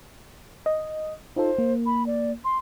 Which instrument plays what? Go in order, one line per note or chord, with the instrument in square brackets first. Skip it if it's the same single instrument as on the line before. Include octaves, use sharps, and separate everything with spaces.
[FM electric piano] D#5
[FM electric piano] D#4 F4 A4 [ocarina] C5
[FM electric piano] A#3
[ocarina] B5
D5
C6